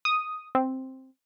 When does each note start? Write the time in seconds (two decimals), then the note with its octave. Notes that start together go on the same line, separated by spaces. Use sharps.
0.05 D#6
0.55 C4